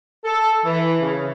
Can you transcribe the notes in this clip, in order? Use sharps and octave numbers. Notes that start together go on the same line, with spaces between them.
A4
E3
C#3